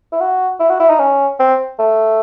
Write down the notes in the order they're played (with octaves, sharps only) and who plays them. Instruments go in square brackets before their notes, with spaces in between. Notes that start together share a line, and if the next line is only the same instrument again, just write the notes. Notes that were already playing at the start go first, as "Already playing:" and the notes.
[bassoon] E4
F#4
E4
F#4
E4
D#4
C#4
C4
A3